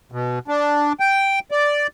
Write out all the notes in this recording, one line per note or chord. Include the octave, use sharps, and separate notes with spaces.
B2
D4
G5
D5